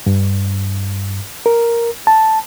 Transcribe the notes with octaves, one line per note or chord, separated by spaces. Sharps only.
G2
A#4
A5